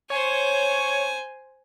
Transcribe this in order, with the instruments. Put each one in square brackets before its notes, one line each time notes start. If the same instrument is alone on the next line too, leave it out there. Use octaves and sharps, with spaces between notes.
[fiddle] C5 G#5 [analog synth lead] C#5